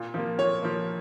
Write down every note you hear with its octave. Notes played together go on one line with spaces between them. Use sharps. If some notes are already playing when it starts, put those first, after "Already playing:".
Already playing: A#2
F3 A#3
A#2 C#5
F3 A#3